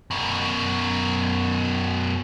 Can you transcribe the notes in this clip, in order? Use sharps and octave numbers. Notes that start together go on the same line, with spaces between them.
F#2 B2